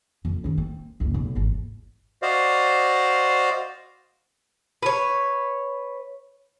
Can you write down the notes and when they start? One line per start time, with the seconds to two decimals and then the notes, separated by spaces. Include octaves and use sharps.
0.25 F2
0.44 D#3 C#4
0.58 C4
1.00 F#1 C#2
1.14 B1
1.35 G#1 E2
2.22 F#4 C5 D5 D#5 F5
4.83 B4 C#5